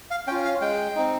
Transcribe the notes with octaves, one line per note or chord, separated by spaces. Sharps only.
F5
C#4 F4 G5
F5
G#3 G5
C4 D#4